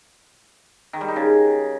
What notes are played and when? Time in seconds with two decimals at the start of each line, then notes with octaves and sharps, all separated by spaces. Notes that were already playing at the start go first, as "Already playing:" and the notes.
0.93 D#3
1.01 G3
1.08 D#4
1.16 C#3